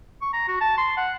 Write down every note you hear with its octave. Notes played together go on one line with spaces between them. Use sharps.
C#6
A#5
F#4
A5
C6
F#5